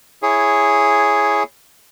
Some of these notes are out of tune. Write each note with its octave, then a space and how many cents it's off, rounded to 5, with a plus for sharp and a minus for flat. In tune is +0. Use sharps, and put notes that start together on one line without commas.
E4 +0 G#4 +0 C#5 +0